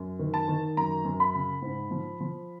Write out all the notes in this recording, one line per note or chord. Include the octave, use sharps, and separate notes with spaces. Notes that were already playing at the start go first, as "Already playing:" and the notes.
Already playing: F#2
D#3
A5
D#3
F#2 A#5
F#2
B5
C#3
G#2
F3
F3